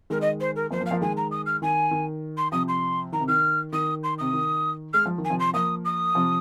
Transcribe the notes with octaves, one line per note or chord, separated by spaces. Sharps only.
D#3 G#3 A#4
D#5
C5
A#4
F3 A#3 C5
F3 A#3
F5
F3 A#3
D#3 G#3 G#5
A#5
D#6
F6
D#3 G#5
D#3
C6
C3 F3 D#6
C6
D#3 A#5
C3
D#3 F6
D#3 D#6
C6
C3 D#6
D#3
G#3 F6
F3
D#3
G#5
C3 F3
C6
F3 A#3 D#6
D#6
C3 F3